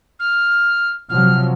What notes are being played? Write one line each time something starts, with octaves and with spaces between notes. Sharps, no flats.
F6
C3 F3 F#3 F6